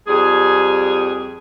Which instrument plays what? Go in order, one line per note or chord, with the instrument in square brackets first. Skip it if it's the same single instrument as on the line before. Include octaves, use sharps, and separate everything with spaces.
[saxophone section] F2 G3 G#4